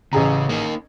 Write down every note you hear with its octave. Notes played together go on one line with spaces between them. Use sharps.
A1 C#3 G#4 A#5
A#3 D#4